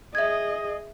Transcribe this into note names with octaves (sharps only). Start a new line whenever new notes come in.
G#4 D#5 E5 G#6